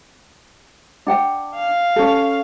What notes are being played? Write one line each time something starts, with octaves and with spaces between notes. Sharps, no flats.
D4 F#5 G5
F5
C#4 A4